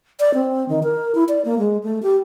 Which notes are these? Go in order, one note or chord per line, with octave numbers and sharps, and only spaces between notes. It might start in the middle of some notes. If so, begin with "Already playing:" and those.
D5
C4
D#3
A#4
E4
D5
A#3
G#3
A3
G4